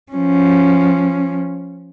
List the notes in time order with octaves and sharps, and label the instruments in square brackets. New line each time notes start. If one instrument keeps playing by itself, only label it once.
[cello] F3 C#4